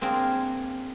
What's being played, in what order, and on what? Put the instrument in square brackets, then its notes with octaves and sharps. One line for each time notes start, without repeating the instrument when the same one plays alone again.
[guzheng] A#3 C4 D4 G#4 A#4